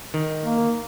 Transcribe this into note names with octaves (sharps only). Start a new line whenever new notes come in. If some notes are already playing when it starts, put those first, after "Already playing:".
D#3
A#3